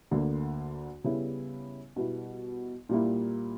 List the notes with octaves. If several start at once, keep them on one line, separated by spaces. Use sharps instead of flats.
D2 D3 A#3
C#3 G3 B3 E4
B2 G3 B3 E4
A#2 G3 A#3 E4